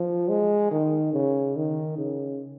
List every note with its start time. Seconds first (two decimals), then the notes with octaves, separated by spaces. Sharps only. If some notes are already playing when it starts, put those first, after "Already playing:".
Already playing: F3
0.29 G#3
0.71 D#3
1.13 C#3
1.56 D#3
1.98 C#3